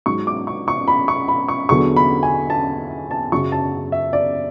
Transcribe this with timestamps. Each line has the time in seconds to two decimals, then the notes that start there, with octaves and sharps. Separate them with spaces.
0.06 G#2 F#3 C#6
0.27 D6
0.47 C#6
0.68 C#6
0.88 B5
1.08 C#6
1.28 B5
1.49 C#6
1.69 E2 D3 F#3 C#6
1.96 B5
2.23 G#5
2.50 A5
3.11 A5
3.32 F#2 C#3 F#3 C#6
3.52 A5
3.92 E5
4.13 D5